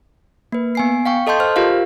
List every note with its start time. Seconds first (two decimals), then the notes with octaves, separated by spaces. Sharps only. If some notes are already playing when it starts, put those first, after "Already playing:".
0.52 A#3 B4
0.75 B3 G#5 C7
1.06 F5 G5 C#6
1.27 A4 D#5 A5 C6 G6
1.40 C5 F6
1.56 F4 G4 A#4 F5